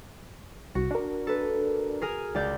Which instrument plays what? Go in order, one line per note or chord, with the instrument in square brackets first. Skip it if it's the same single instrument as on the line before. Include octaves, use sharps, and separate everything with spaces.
[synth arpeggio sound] C2 [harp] F#4
[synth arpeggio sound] D4 A#4
[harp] A4 B4
G#4 A#4 G#5
C#2 D5 G6